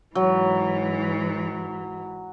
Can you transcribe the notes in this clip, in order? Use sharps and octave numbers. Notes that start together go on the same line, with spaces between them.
G#2 E3 F#3